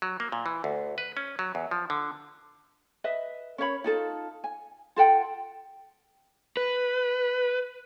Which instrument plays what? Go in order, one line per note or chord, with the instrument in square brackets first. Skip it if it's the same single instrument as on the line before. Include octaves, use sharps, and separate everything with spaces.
[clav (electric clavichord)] F#3
A#3
A#2
E3
D2
B4
C#4
F#3
E2
F3
D3
[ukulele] B4 D#5 E5
C#4 A#4 C#5 B5
D#4 F4 A4
G#5
F4 A4 F#5 G5
[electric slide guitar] B4